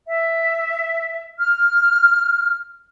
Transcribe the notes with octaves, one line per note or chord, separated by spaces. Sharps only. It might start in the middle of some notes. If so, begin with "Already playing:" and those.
E5
F6